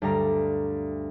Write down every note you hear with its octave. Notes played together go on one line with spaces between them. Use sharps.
D2 G2 G3 F5 A#5